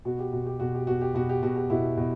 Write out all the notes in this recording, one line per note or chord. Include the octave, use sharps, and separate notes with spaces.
B2 F#4
G4
B2 F#4
G4
B2 F#4
G4
B2 F#4
G4
B2 F#4
G4
B2 F#4
G4
B2 E4 F#4
B2